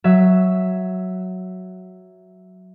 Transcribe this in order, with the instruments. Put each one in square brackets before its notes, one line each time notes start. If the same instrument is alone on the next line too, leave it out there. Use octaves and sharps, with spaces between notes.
[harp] F#3 E5